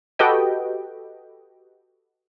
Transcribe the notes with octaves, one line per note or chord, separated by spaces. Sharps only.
F#4 G4 A4 B4 D#5 G5